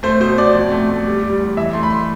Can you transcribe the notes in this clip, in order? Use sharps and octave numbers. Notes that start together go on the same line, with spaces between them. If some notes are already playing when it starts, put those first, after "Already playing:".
A3 C5
B2 C5
B2 D5
F2
A3
A3
G3
G3
E2
E3 E5
A3 C6
B5
C6